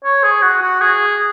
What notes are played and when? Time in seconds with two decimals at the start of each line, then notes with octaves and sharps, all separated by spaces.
0.04 C#5
0.24 G#4
0.42 F#4
0.62 F#4
0.81 G#4